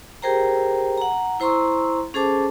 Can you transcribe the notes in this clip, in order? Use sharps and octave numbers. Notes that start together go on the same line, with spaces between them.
G4 G#4 A#4 C5 G5 A#5
F#5 A#5
E4 C5 A#5 C6 C#6 E6
C#4 G#4 A4 C5 A5 D6